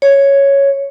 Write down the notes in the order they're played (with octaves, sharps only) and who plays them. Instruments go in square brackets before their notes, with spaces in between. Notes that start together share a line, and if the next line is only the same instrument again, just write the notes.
[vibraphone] C#5